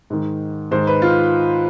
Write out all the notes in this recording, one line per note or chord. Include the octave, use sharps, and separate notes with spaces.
G#2 D#3
G#2 D#3 C5
B4
F4